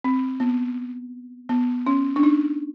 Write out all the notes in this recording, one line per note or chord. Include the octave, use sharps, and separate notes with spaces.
C4
B3
B3
C#4
D4
D#4